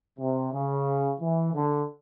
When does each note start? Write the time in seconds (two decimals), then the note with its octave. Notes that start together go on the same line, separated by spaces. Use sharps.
0.19 C3
0.53 C#3
1.20 E3
1.54 D3